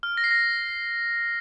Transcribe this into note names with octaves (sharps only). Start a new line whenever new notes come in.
F6
A#6
C7
A#6